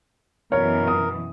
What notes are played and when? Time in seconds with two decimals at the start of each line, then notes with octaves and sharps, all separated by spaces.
0.52 F#2 B2 E3 A#4 C#5
0.88 D#6